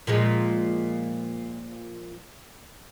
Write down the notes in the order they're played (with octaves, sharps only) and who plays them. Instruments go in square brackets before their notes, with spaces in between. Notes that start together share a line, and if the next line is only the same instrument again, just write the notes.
[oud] A#2 F3 G#3